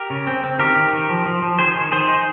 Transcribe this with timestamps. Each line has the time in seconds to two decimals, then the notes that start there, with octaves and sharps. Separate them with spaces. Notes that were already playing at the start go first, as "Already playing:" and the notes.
Already playing: G4 A#4
0.10 C#3
0.27 C4
0.44 C4
0.59 D#3 G4 A#4
0.76 D#3
0.93 D#3
1.09 F3
1.26 F3
1.42 F3
1.59 D#3 G#4 C5
1.75 D#3
1.92 D#3 G#4 C5
2.08 D#4